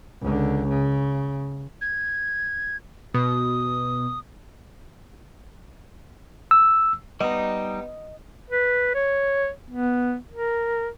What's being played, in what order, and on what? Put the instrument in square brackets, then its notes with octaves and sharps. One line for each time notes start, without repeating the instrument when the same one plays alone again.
[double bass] C#2 D3
C#3
[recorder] G#6
[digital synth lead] B2 [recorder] D#6
[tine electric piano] E6
[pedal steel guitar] G3 D#4 [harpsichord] B3 [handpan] D#5
[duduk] B4
C#5
B3
A#4